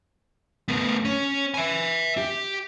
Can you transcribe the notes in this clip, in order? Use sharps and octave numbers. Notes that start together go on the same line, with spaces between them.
A3 B3
C#4
E5 G#5
G4